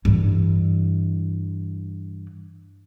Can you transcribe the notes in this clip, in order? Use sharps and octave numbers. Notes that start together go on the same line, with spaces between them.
G2 E3